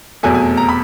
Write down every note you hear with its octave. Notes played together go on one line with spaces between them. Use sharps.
F1 E2 B2 F#3 A3 G#5
G#5
A#5
B5